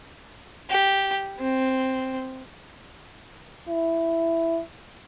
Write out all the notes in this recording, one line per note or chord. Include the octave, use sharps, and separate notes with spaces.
G4
C4
E4